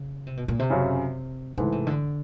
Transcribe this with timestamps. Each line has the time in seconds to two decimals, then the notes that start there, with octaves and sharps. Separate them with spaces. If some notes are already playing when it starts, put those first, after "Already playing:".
Already playing: C#3
0.27 C3
0.37 B2
0.48 A#2
0.59 C3
0.70 F#2 C#3 F#3
1.58 G#2 C#3 E3 A3
1.72 C3
1.87 D3